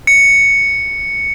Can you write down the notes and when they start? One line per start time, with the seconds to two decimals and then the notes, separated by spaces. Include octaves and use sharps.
0.07 C#7